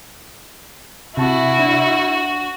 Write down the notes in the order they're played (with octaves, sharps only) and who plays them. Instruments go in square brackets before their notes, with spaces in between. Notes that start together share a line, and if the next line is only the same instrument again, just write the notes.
[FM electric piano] C3 A5 [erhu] E4 [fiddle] F#4
[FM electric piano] D4